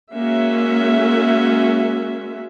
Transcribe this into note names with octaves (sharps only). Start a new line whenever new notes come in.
G#3 A#3 C#4 F#4 E5